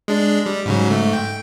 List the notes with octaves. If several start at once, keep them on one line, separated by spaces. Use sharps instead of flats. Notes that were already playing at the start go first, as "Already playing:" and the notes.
G#3 D4
G3
G#2 C#3 F#3
G#2 A3
G5